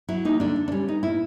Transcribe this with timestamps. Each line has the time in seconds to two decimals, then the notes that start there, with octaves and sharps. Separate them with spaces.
0.08 F#3 E4
0.25 A#3 D#4
0.40 D3 D4
0.56 D3
0.68 D4
0.72 G3 C#4
0.88 B3 D#4
1.03 A#2 E4